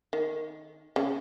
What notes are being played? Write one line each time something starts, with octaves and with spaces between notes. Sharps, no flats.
D#3
C#3